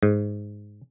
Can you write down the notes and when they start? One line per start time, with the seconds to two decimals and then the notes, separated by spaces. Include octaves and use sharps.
0.03 G#2